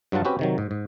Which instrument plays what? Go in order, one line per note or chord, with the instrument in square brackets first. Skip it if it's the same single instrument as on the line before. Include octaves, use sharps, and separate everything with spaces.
[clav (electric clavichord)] G2 F#3 F4 F#5 A5
C4 C#4 F#4 G4 B4
C3 D#3 F#3
G#2
G#2